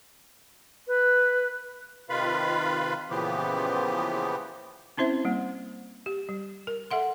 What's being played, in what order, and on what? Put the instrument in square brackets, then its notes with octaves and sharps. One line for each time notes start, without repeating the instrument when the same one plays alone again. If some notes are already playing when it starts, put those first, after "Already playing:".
[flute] B4
[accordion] C3 D#3 F4 B4 F5 B5
A#2 C#3 E3 F3 B3 G4
[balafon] C4 C#4 E4 C5 E5
G3 A#3
G4
G3
A#4
A4 E5 F#5 C6